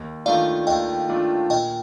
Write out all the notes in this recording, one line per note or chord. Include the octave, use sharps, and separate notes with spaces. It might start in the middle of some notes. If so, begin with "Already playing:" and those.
Already playing: D#2
D#3 A3 D4 F4 D5 F5
D#2 D#5 G5
D#3 A3 D4 F4
A#2 D#5 G5